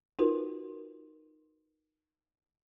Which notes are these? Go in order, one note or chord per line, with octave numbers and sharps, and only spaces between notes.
D#4 F4 F#4 A#4 B4